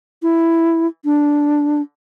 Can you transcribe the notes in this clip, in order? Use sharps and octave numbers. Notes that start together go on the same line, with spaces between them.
E4
D4